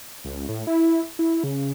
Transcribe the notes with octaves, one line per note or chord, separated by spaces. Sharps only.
C#2
A2
E4
E4
C#3